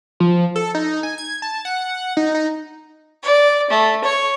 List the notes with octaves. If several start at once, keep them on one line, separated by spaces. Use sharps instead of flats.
F3
A4
D#4
G#5
G#6
A5
F#5
D#4
D#4
D5
A3
C#5